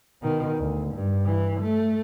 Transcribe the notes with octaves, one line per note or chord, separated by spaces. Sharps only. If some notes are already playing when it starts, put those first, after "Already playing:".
B2 D#3
D2
G2
E3
A3